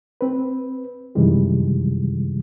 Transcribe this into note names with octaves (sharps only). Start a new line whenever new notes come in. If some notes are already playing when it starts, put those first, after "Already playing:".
C4 B4
F#2 C3 D#3 E3 G3 G#3